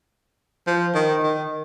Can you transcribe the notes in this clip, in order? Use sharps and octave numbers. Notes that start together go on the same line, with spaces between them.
F3
D#3
D#3